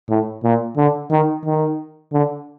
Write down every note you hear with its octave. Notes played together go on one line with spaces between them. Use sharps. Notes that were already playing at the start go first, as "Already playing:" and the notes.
A2
A#2
D3
D#3
D#3
D3